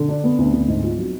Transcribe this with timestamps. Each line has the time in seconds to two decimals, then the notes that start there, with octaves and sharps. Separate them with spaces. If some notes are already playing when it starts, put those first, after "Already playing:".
Already playing: D3
0.09 D4
0.24 B3
0.38 D2
0.53 D2
0.68 G#2
0.83 F4
0.98 F#3